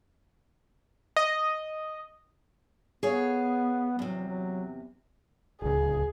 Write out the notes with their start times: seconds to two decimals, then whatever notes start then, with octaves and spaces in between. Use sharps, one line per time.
1.16 D#5
3.03 B3 G#4 C#5 F5
3.99 E2 C3 F#3
4.27 F#3
5.62 D1 C#2 G#4